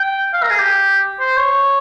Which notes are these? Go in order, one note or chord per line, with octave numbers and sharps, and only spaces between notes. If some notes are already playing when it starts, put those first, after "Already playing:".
Already playing: G5
F5
A#4
G#4
G4
C5
C#5